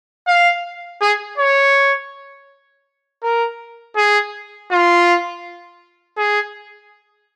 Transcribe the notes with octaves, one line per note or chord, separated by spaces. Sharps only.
F5
G#4
C#5
A#4
G#4
F4
G#4